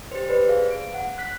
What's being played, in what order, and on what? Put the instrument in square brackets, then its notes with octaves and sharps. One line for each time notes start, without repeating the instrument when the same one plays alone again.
[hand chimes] G4 C5
B4 C5 D5
G#4 F5
D7
F#5
F#6 B6